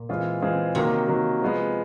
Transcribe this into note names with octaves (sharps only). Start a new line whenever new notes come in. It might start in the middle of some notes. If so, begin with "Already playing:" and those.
Already playing: A#2
E3 G#3 C4 F4 G#4
E3 G#3 C4 F4 G#4
C3 D#3 F#3 A#3
D#3 F#3 A#3
F3 G#3 B3